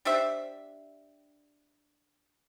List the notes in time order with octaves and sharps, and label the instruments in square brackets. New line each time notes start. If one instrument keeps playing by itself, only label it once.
[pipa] D4 G4 C5 E5